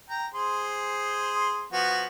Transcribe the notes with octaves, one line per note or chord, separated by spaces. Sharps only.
G5 A#5
G#4 C5 C6
F3 B3 F#4